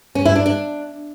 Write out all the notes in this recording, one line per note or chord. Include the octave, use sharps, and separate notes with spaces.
C#4
E4
D4
D4